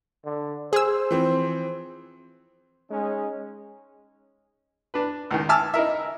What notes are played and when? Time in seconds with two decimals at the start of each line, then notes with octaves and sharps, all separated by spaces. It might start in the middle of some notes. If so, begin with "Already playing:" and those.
0.25 D3
0.73 G#4 C5 E6
1.11 E3 F3 C4
2.90 G#3 C#4 D#4
4.94 D4 B4
5.31 C#2 D#3
5.49 E5 G#5 A5 D6 E6 F6
5.74 D#4 E4 A#4 E5